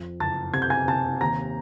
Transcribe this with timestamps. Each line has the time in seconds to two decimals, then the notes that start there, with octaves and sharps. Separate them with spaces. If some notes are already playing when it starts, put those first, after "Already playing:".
Already playing: F2
0.20 F#1 A5 A6
0.53 C3 G#6
0.62 G6
0.70 G#5 G#6
0.88 C3 A5 A6
1.21 D#2 A#5 A#6